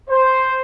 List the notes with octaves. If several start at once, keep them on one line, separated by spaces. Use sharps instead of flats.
C5